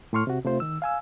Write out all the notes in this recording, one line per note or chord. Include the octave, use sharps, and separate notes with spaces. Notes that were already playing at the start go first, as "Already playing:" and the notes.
A2 A4 C6 C#6 F6
C3 F#4
C3 A3 F4 C5
D#3 E6
F5 G#5 E6